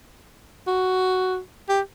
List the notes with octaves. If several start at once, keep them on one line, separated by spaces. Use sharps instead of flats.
F#4
G4